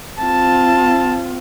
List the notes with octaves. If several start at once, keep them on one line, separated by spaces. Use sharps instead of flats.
C4 F4 A5